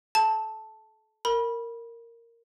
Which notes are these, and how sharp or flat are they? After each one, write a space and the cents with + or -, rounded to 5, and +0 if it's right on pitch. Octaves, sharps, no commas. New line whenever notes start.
A4 -40 A5 +0
A#4 -10 B5 -20